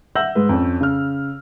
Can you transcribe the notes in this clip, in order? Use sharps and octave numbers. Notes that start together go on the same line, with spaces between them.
E5 F#5 E6 G6 A#6 F#7
G#2 G#3 B4
F2 C#4
C#3 F6